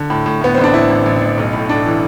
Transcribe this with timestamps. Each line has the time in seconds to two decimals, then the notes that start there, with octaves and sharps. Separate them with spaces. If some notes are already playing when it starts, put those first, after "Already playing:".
Already playing: D3
0.10 A2
0.26 A2
0.41 A2 B3
0.54 A1 C4
0.64 D4
0.74 A1 E4
0.89 A1
1.06 A1
1.21 A1
1.38 B1
1.53 A2
1.69 A2 D4
1.86 E3